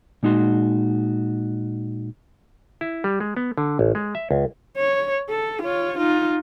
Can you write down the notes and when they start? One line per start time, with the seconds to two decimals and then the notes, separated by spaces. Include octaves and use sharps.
0.23 A#2 G#3 D#4 F#4 C6
2.81 E4
3.04 G3
3.20 G#3
3.37 B3
3.58 D3
3.79 A1
3.95 G#3
4.15 E5
4.31 C#2
4.78 C#5
5.30 A4
5.63 F4 C#5
5.97 D#4 F4